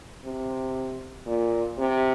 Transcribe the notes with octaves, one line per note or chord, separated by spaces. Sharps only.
C3
A#2
C3